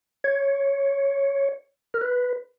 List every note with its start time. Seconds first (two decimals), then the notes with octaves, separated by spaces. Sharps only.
0.24 C#5
1.94 A#4
2.02 B4